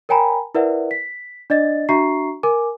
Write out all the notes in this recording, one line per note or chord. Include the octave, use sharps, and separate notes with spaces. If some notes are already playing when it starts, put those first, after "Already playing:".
A#4 C#5 G5 G#5 A#5 B5
E4 A#4 B4 D5 E5 F#5
B6
D4 D5 D#5 A6
D4 F#4 E5 A#5 C#6 C7
A#4 G#5 D6